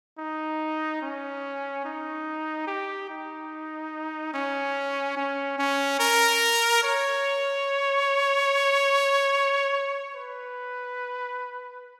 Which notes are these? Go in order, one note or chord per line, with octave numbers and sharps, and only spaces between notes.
D#4
C#4
D#4
G4
D#4
C#4
C#4
C#4
A#4
C#5
B4